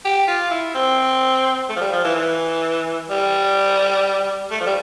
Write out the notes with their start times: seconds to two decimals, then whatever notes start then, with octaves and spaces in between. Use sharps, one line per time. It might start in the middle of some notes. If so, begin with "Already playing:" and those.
0.05 G4
0.28 F4
0.51 E4
0.75 C4
1.69 A3
1.76 F3
1.81 G3
1.92 F3
2.04 E3
2.15 E3
3.10 G3
4.51 A3
4.60 F3
4.66 G3